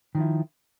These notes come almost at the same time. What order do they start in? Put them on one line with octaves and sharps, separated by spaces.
D#3 F3 E4